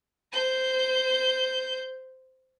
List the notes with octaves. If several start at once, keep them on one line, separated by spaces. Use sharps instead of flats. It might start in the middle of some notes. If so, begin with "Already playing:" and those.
C5 G6